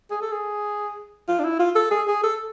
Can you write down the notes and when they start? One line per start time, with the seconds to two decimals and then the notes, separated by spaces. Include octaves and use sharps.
0.11 G#4
0.22 A4
0.32 G#4
1.28 F4
1.39 D4
1.44 E4
1.59 F4
1.75 A4
1.91 G#4
2.07 G#4
2.23 A4